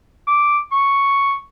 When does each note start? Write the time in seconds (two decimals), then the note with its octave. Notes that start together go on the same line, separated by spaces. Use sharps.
0.27 D6
0.72 C#6